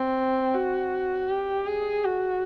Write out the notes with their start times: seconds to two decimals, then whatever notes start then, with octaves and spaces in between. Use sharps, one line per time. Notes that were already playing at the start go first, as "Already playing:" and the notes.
Already playing: C4
0.54 F#4
1.29 G4
1.67 G#4
2.04 F#4